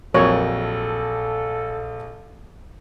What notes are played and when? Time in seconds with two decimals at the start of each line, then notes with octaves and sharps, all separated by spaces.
0.14 A#1 F2 F#3 A4 A#4 C#5